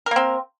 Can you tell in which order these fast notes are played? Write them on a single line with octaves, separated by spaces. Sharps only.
A#4 A#3 C4